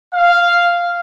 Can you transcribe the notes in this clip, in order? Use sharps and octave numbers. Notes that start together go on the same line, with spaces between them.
F5